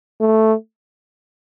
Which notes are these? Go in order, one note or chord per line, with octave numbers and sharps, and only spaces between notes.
A3